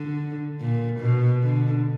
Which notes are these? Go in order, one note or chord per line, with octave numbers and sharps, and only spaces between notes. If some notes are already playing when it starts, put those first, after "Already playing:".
Already playing: D3
A#2
B2
D3